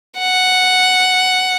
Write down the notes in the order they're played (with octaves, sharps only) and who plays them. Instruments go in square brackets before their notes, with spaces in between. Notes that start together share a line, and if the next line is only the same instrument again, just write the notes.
[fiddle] F#5